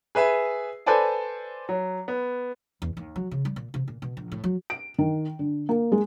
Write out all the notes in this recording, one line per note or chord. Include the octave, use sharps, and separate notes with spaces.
G#4 B4 E5 G#5
A4 B4 C5 D5 G#5 A5
F#3
B3
E2
D#2
F#3
C#3
G3
A#2
C3
A#2
B2
A#1
A2
F#3
D7
D#3
D3
A#3
G#3